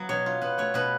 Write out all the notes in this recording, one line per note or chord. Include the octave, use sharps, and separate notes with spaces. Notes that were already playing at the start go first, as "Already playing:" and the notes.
Already playing: F#3 B3
B2 C#5
F4
B2 B4
A3 C#5
B2 B4